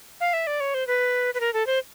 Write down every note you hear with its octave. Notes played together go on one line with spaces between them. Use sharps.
F5
E5
D5
C#5
C5
B4
B4
A#4
A4
C5